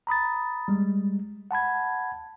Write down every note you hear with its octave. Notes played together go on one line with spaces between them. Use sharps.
A#5 B5 D#6 A6
G3 G#3
F#5 A5 B5 G#6